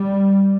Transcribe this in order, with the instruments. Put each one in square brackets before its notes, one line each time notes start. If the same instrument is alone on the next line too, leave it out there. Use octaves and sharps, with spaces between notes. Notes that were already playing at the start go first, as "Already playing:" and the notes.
Already playing: [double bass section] G3